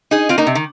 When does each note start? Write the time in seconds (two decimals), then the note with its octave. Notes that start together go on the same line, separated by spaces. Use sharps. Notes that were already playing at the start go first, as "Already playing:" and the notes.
0.11 D#4 G#4
0.29 C4 F4
0.38 A#3 D#4
0.47 C3
0.55 D#3